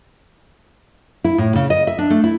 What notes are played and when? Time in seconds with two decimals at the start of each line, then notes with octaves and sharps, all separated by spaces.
1.24 E4
1.38 A2
1.56 C#3
1.70 D#5
1.87 E5
1.98 D4
2.10 A3
2.24 E4